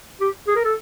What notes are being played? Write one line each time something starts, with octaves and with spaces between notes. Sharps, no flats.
G4
G#4
A#4
A4